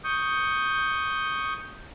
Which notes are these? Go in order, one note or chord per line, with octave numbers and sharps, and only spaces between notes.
C#6 D#6 G6